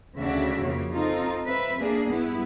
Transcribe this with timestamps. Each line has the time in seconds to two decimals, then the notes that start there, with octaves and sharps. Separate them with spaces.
0.18 D2 C#3 D4 F#4 E5
0.58 F2 C#3 A#3
0.92 C4 D#4 F4 A4
1.45 C4 B4 E5
1.78 A#3 D4 G#4
2.08 G2 B3 E4